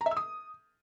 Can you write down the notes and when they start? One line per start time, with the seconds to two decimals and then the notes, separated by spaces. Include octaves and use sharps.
0.01 A#5
0.06 E5
0.11 E6
0.17 D#6